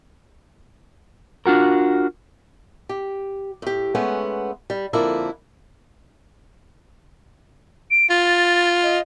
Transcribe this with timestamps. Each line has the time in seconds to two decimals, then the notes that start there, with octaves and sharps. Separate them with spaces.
1.46 D4 F4 F#4 A#4
2.89 G4
3.62 A2 G4
3.95 G#3 A3 B3 C#4 F#5
4.70 G3
4.93 F2 D3 F3 A#3 D4 E4
7.91 D7
8.10 F4 A6
8.83 D#5